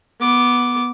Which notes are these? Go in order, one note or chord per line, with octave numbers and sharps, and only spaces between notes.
B3 D6